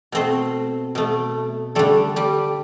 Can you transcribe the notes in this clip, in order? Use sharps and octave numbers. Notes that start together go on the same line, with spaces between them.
B2 A3 C4 C5
B2 A3
D3 G3 A3 A4
G3 G4